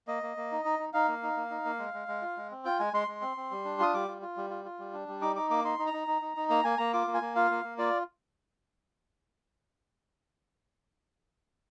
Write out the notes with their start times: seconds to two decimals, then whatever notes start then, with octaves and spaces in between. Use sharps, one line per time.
0.08 A#3 D#5
0.23 A#3
0.37 A#3
0.52 D#4
0.65 D#4
0.79 D#4
0.93 D#4 F5
1.08 A#3
1.23 D#4
1.37 A#3
1.51 D#4
1.65 A#3
1.79 G#3
1.94 G#3
2.08 G#3
2.22 F4
2.37 G#3
2.51 C4
2.65 F4 G5
2.79 G#3 G#5
2.93 G#3 C6
3.08 G#3
3.22 C4
3.37 C4
3.51 G3
3.65 D4
3.79 F4 D#6
3.94 G3 D6
4.08 F4
4.22 F4
4.37 G3
4.50 F4
4.65 F4
4.79 G3
4.93 D4
5.08 G3
5.21 D#4 D6
5.36 D#4 D6
5.50 A#3 D6
5.64 D#4 C6
5.79 D#4
5.87 A#5
5.93 D#4
6.08 D#4
6.22 D#4
6.37 D#4
6.50 A#3 A#5
6.64 A#3 G#5
6.78 A#3 A#5
6.93 F4 D6
7.07 A#3
7.14 G#5
7.22 A#3
7.36 F4 F5
7.51 A#3
7.64 A#3
7.78 F4 D5